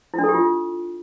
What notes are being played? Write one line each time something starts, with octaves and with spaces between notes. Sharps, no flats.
E4
D4
A4
G4
F4